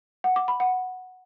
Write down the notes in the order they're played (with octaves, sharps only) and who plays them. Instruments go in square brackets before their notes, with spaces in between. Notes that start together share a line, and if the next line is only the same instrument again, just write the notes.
[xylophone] F#5
D6
B5
F#5